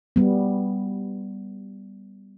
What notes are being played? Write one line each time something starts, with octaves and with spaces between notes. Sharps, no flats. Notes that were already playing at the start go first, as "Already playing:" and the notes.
G3 B3